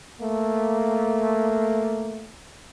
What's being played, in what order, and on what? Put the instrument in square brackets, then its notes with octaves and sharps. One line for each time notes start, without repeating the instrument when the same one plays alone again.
[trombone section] A3 A#3